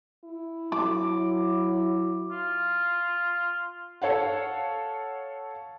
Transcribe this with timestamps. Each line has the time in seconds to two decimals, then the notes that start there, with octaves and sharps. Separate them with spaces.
0.24 E4
0.72 F#3 D6
2.31 F4
4.02 A4 C#5 F5 F#5